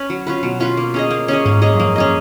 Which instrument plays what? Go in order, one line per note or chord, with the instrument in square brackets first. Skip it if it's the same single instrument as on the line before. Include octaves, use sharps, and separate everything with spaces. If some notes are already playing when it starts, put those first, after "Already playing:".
Already playing: [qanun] C#4 B4
F#3
C#4 F4 B4
[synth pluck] B2 [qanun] F#3
[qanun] C#4 F4 B4
A#3
C#4 G#4 D#5
A#3
C#4 G#4 D#5
[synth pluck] G#2 [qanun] A#3
[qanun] C#4 G#4 D#5
[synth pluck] F#2
[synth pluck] F2 [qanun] A#3
[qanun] C#4 G#4 D#5